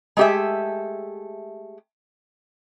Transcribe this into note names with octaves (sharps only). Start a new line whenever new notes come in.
G#3 A3 G4 G#4 E5